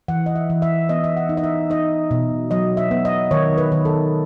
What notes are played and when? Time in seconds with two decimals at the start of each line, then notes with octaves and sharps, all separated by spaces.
0.08 E3 F#5
0.26 D#5
0.36 E5
0.50 E3
0.62 E5
0.89 B3 D#5
1.04 E5
1.17 F#5
1.29 D#4
1.37 D#5
1.43 E5
1.70 D#4 D#5
2.11 B2
2.51 F#3 D#5
2.77 E5
2.91 B3
3.05 D#5
3.31 D#3 C#5
3.58 B4
3.72 D#3
3.85 A4